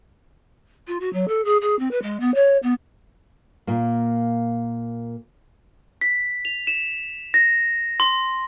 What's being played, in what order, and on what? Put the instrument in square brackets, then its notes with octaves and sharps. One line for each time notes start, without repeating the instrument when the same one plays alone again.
[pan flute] F4
F#4
F#3
A4
G#4
G#4
C4
B4
G#3
B3
C#5
B3
[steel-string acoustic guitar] A#2 A#3
[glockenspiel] B6
F7
E7
A#6
C6